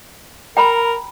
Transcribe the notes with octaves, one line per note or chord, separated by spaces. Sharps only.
A#4 G5 A#5 B5